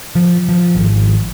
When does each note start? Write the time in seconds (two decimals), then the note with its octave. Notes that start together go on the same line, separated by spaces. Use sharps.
0.15 F3
0.49 F3
0.75 G#1